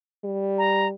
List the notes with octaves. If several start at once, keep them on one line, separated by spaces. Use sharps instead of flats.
G3
A#5